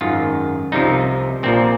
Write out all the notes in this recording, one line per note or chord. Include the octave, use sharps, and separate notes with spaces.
G#1 F#2 D#3 F4
C2 C3 F3 D#4
A#1 A#2 F3 C4